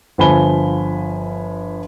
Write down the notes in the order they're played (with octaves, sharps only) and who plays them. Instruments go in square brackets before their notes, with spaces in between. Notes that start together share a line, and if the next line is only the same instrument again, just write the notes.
[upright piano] G1 F3 G#5 B5 G7